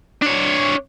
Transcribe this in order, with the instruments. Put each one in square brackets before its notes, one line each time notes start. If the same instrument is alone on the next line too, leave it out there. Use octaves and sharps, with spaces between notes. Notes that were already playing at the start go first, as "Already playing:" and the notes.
[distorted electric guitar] D4 C#5